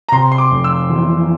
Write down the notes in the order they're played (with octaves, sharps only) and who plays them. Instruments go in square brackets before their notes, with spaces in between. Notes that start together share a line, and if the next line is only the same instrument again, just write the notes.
[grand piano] A#5
[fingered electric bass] C3 [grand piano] C6
[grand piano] C6
D6
[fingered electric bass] F2
[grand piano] E6
[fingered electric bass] E3